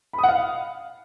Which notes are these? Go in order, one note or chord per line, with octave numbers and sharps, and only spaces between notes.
B5
D#6
F#5
F5